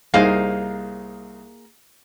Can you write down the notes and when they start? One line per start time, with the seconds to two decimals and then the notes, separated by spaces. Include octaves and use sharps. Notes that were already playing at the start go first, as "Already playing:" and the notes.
0.14 C2 A#3 D#4 G#4 C5 F5